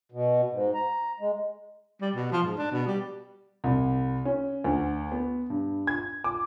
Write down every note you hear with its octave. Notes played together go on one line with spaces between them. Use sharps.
B2
G#2
A#5
G#3
G3
B2
F3
G#2
D4
B2
G3
C2
C#4
D2
B3
G2
G#6
D6